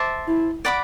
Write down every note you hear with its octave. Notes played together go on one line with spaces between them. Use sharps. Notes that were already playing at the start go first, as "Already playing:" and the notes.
Already playing: C5 E5 A5 D6
E4
D5 F#5 B5 D6